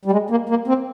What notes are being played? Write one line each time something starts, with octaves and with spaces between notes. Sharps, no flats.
G3
G#3
A#3
A#3
C4